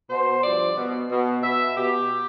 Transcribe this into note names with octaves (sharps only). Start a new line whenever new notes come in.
B2 C5
G2 F3 D5
B2
B2
B2 E5
B2 G4